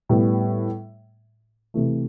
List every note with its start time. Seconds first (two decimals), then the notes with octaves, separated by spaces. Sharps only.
0.09 A2 G3 B3
1.74 C3 E3 A3